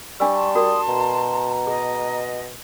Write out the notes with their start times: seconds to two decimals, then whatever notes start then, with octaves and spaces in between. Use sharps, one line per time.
0.20 G3 D4 G#5 C#6 E6
0.33 A5 C6
0.55 F#4 A#4 D5 D#6
0.88 B2 A#5
1.67 G#4 D#5